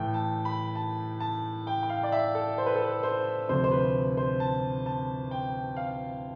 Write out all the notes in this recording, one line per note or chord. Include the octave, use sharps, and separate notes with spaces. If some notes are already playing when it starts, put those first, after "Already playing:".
Already playing: A2 E3 A3 G5
A5
B5
A5
A5
G5
G5
F5
D5
E5
A4
C5
B4
A4
B4
C5
D2 C3 F3 C5
C5
B4
C5
A5
A5
G5
F5